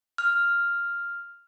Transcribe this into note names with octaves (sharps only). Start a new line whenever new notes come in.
F6